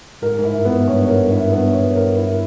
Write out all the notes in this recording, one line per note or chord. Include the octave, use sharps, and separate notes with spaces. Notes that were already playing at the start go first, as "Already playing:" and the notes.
G#2 A#4
G#2
E4
G2
B3
G#2
G2 A#2 C#5
A#4
G2
E4
G#2
G2 B3
C#5
G2
A#4
E4